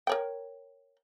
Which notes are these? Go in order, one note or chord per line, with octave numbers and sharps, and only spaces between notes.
A#4 C#5 G5